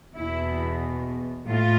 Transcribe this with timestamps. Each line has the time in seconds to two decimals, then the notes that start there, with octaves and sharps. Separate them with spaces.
0.16 E2 B2 E4
1.49 A2 F4